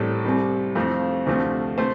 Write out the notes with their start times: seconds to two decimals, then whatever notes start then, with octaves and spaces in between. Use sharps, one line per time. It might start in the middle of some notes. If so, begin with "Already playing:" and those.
Already playing: A1 A2 G3 C4 A4
0.25 C2 C3 G3
0.75 F2 F3 A3 C4
1.27 D2 C3 F3 A3 C4
1.78 C3 A3 C5